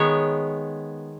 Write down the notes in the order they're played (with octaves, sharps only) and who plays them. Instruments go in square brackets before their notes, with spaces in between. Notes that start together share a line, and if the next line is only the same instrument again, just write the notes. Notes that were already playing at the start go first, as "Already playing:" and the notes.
Already playing: [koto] D#3 G#3 B3 C#5